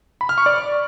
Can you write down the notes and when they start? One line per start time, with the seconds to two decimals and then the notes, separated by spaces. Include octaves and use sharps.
0.21 B5
0.29 F6
0.38 C#6
0.46 D5